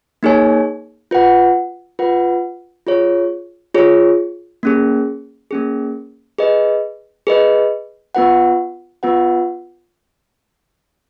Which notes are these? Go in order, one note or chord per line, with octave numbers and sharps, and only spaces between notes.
A#3 D#4 G#4 C#5 G#5
F4 B4 F#5
F4 B4 F#5
F4 G#4 C#5
F4 G#4 C#5
A#3 C#4 G#4
A#3 C#4 G#4
G#4 B4 D#5
G#4 B4 D#5
B3 F4 B4 F#5
B3 F4 B4 F#5